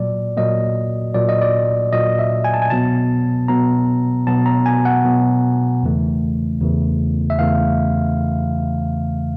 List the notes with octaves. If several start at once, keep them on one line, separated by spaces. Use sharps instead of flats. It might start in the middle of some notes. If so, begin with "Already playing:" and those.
Already playing: A#2 F#3 A#3 D5
A#2 F#3 A#3 D#5
A#2 F#3 A#3 D5
D#5
D5
A#2 F#3 A#3 D#5
E5
G#5
A5
G#5
B2 F#3 B3 A5
B2 F#3 B3 A#5
B2 F#3 B3 A5
A#5
G#5
F#5
B2 F#3 B3
E2 C#3 E3 A3
E2 C#3 E3 A3
E5
E2 C#3 E3 A3 F5